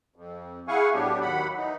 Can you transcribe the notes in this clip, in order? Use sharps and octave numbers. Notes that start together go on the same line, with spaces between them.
F2
E4 G#4 F5 F#5 G#5 C#6
A2 F#3 B3 D4 G4
D#2 F#3 F#5 B5
E3 D#4